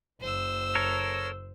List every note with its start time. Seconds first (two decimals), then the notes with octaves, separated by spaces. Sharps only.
0.21 F#1 C5 E6
0.75 A4 A#4 C#5